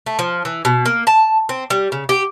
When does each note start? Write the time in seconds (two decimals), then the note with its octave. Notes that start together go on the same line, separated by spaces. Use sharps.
0.06 A3
0.19 F3
0.45 E3
0.65 B2
0.86 A#3
1.07 A5
1.49 C4
1.70 G3
1.92 C#3
2.09 G4